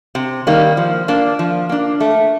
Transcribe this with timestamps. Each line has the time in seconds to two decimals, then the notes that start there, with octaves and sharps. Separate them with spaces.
0.15 C3
0.47 D#3 G3 A#3
0.77 F3
1.08 A#3 D4
1.39 F3
1.69 A#3 D4
2.00 A3